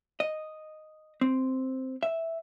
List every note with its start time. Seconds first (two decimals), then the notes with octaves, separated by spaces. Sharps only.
0.20 D#5
1.21 C4
2.03 E5